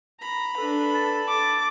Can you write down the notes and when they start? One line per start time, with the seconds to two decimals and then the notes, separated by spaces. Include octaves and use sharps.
0.21 A#5 B5
0.58 D4 A4 B4
0.95 A5
1.28 D6